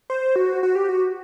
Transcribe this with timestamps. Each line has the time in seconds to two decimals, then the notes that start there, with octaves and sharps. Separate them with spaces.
0.10 C5
0.36 F#4
0.63 F#4
0.75 G4
0.89 F#4